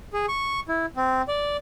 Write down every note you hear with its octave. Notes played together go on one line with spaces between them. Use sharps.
G#4
C#6
E4
C4
D5